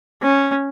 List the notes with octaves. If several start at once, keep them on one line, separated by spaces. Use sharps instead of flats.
C#4